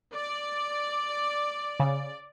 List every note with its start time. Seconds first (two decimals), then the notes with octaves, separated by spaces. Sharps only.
0.13 D5
1.80 C#3